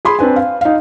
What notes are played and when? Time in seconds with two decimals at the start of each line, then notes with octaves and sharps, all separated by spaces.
0.05 G#4 B5 C6
0.19 C4 D4 B4 G#5
0.36 F5
0.61 D#4 F5